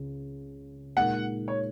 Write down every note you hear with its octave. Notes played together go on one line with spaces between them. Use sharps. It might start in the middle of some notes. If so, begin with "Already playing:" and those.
Already playing: C#2 C#3 G#3
A#2 G#3 D#4 A#4 F#5
C#5